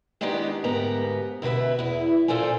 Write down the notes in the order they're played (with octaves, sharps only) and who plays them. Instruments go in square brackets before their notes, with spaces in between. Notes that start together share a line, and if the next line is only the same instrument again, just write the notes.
[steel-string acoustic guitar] D#3 G#3 B3 D4 D#4 G4
D2 G#2 B3 G4 A#4 A#5
D2 B2 A4 B4 E5
E2 E4
A#2 F4 A4 C5 D5 G#5